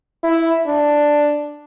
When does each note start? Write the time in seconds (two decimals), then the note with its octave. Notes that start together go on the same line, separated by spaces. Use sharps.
0.23 E4
0.67 D4